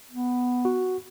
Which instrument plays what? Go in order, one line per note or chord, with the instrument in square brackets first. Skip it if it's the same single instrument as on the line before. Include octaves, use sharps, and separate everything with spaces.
[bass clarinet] B3
[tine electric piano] F#4